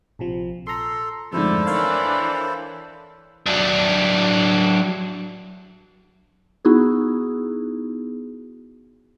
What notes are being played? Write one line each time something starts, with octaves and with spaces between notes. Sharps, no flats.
A#1 C3 F3
A4 A#5 C6
F2 G#2 D3 A3 E4 A4 C5
E3 D4 A#4 C#5 F5
F#3 D4
B3 D#4 E4 F#4 G#4